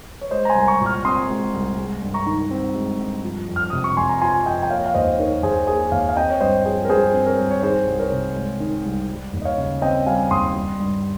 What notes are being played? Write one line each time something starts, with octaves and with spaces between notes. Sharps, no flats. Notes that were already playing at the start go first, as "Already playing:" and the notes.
C#5
G#3 C5 D#5
A#5
G#5 C6
C2
A#5 C#6
A#2
C#6 F6
C4 C6 D#6
G#3
C2
G#3
G2
A#5 C#6
D#3
C4
G#3
G2
F3
F2
F6
C3 D#6
C#6
F2 G#5 C6
A#5
F3 G#5 C6
F2 D#5 G5
G5
A#3 C#5 F5
F5
D#2 C5 D#5
D#3 A#4 C#5
D#2 G#4 C5
A#3 G#4
D#2 C#5 F5
F5
C4 D#5 G5
C#5
G2 C5 D#5
F3 G#4 C5
A#4
G2 G#4 C5
C4
A#4 C#5
G2
C#5
D#3 G#4 C5
C2
A#4 C#5
C3
G#3
D#3
C2
G3
D#2
D#5
C#5 F5
C#3
C4 D#5 G5
G3 F5 G#5
D#2 C6 D#6
G3
G2